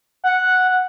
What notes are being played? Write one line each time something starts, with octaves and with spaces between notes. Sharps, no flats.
F#5